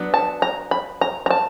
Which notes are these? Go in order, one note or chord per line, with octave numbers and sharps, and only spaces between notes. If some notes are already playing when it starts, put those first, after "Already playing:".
Already playing: F#3 B3 D4
A5
A#5
B5
A#5
A#5
A5